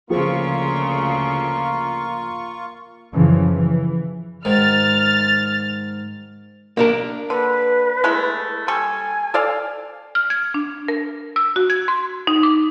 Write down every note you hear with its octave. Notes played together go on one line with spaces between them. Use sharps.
D2 C#3 F3 A#3 F4 G#4 C5 C#6
F#2 C#3 E3 F3
E3
G#2 D#3 F6 A6
A#3 D4 A#4
D3 B4
G#3 A3 E4
G3 A4 G#5 C#6
A4 D5 F5
F6
G#6
D4
A#4
E6
F#4
G#6
C6
D#4
D6